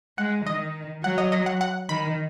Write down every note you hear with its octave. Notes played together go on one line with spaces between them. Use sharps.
G#3 F#5
D#3 D#5
F#3 F#5
D#5
D#5
F#5
F#5
D#3 B5